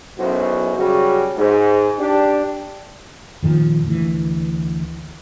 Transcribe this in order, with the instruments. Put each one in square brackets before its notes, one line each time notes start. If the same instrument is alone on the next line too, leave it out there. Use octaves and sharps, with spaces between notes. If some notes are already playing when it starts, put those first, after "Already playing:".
[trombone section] B1 F#2 C#4 E4 F#4 C5
C#3 F#3 G3 C#4 F#4
G#2
D4 G4
[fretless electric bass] F2 A#2 D#3 F3
D2 E3